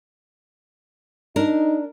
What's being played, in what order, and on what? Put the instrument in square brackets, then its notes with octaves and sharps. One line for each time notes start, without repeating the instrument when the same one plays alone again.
[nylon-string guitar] D4 A#4 [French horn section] D#4